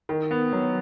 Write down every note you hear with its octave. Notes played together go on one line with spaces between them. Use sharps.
D#3
B3
F#3